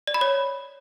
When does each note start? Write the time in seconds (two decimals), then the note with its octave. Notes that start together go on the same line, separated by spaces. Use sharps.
0.07 D5
0.14 B5
0.21 C#5